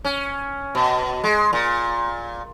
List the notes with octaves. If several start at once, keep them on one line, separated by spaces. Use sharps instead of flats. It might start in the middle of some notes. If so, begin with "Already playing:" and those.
C#4
B2
G#3
A#2